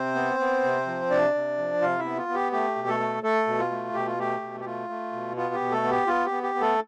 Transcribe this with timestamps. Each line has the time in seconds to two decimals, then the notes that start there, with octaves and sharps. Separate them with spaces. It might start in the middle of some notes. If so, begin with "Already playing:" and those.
Already playing: C3 C4 C5
0.15 B3
0.40 B3
0.63 C3
0.86 F3
1.10 C3 D4 D5
1.35 C3
1.58 F3
1.81 C3 F4 F5
1.99 E4 E5
2.05 B3
2.17 F4
2.29 B3
2.34 G4
2.52 A3 G4
2.76 B2
2.88 A3 A4
3.00 A3
3.23 A3 A4
3.47 B2
3.59 F4
3.71 A3
3.94 B2 G4
4.07 F4
4.19 A3 G4
4.42 B2
4.60 G4
4.65 A3 F4
4.90 A3
5.12 B2
5.37 B3 F4
5.54 G4
5.60 B2
5.72 A3 A4
5.84 B3
5.90 G4
6.07 B3 F4
6.26 G4
6.31 B3
6.43 G4
6.55 B3
6.61 A3 A4